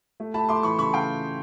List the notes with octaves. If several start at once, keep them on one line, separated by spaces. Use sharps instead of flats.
A3
A3 A5 B5
A3 C6 D6
E3 B5 C#6
C#3 B5 C#6
C#3 F5 G5